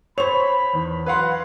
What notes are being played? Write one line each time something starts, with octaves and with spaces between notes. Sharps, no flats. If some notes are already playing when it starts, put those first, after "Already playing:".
C5 C#5 B5 F7
E2
F#3 B4 F5 F#5 C6